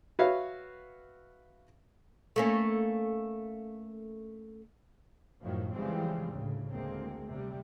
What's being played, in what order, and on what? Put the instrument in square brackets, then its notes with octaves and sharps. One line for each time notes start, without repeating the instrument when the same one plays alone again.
[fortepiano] F#4 B4 C#5 E5 F5
[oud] A3 A#3 C#4
[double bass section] F#2 A2 D#3 F3 F#3
C#3 E3 F3 G3 G#3 C4
D2 A2 C#3
D2 G#3 A#3 C4
C3 G3